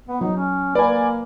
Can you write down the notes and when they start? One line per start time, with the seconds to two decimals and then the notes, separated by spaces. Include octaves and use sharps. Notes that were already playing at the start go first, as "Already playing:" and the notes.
0.09 B3
0.21 F#3 D#4
0.37 C#4
0.75 A#3 B4 D5 G#5